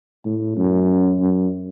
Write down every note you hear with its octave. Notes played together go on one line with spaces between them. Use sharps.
A2
F#2
F#2